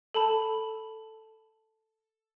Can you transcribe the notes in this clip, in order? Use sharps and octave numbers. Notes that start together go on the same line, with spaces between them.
A4 A5 B5